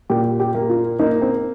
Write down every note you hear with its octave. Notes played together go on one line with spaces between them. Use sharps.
A#2 G4
G4
A#3
F4
A#3 D#4
C4